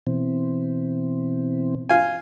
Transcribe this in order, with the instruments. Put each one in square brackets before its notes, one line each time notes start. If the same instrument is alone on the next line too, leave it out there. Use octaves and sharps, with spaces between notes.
[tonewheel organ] B2 E3 C4
[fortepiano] F4 G#5